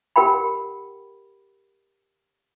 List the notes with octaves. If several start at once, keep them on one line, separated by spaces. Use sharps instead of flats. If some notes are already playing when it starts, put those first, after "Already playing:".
G4 A#4 F#5 G5 B5